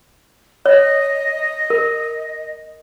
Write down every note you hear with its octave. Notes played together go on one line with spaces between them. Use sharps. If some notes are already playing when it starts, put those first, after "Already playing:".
C#5 D#5
A#4